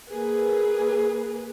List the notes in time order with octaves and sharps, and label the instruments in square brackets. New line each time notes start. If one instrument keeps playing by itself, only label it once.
[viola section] A#3 G#4 B4